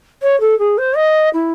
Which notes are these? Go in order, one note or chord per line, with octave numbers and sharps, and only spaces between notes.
C#5
A4
G#4
C5
D#5
E4